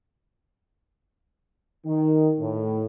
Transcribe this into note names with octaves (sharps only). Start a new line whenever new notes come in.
D#3
A2